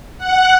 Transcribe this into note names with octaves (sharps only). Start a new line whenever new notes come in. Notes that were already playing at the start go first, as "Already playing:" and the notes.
F#5